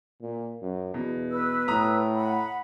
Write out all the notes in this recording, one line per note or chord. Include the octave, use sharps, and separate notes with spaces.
A#2
F#2
E2 B2
B4 E6
A2 A#5 D#6
F#5 B5